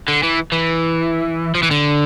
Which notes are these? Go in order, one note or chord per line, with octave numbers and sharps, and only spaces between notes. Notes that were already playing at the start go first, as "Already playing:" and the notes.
D3
E3
E3
F3
E3
D3